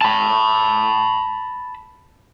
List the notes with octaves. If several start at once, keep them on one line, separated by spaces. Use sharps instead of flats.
A5 B5